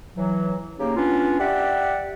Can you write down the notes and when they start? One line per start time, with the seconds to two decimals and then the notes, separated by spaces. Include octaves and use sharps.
0.16 E3 F#3
0.79 C#3 A#3 C#4 D#4 G4
0.96 B3 C#4 D4 F4
1.39 G4 D5 E5 F#5